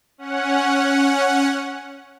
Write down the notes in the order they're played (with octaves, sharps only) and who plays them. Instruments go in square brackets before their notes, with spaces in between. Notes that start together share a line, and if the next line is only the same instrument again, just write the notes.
[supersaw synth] C#4 F#5